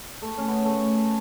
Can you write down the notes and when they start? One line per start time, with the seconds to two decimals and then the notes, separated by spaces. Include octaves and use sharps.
0.22 A3
0.38 C#4
0.48 B3
0.65 A3